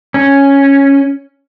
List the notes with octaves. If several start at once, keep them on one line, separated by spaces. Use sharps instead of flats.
C#4